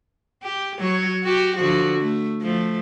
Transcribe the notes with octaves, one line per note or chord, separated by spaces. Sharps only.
G4
F#3 C#5
F#4 G4
D3 F3 F#4
A3
F3 A3